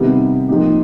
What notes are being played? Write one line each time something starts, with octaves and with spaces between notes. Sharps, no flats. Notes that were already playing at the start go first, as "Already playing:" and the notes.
Already playing: C3 D#3 G3 B3
F3 A#3 D#4 G4